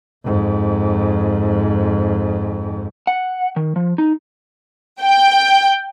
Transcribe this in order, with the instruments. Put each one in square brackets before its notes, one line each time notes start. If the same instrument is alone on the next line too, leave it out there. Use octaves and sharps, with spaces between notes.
[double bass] F2 G#2
[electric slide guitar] F#5
D#3
F3
D#4
[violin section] G5